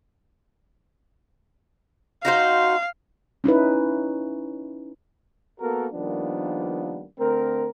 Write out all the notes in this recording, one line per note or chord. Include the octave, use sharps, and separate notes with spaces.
D#4 F#4 C5 F5
C#4 D#4 E4 B4
A#3 B3 F#4 A4 A#4
D#3 F3 G3 A#3 B3 D4
D3 A3 C4 A#4